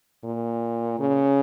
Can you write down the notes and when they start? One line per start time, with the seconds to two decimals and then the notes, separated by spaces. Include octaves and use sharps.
0.24 A#2
1.00 C#3